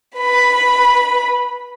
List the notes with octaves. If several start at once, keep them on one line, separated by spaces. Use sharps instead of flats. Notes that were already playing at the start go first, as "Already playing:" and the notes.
B4 B5